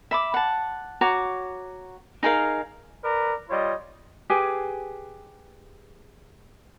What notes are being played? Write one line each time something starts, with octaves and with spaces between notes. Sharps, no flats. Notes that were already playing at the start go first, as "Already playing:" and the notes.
E5 B5 D6
F#5 A5
F#4 C#5 A#5 D6
D#4 G#4 A#4 F5
A#4 B4 D5 A#5
G3 F4 C#5 D#5
G4 G#4 B4 G#5